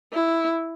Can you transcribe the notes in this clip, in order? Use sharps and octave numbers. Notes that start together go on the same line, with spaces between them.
E4